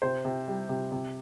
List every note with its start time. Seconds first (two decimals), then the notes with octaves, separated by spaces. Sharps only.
0.02 C3 C5
0.25 C3
0.48 G3
0.69 C3
0.92 C3